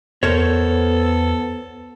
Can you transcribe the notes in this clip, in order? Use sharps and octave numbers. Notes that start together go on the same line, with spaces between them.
E2 B3 A4 A#4 C5 C#5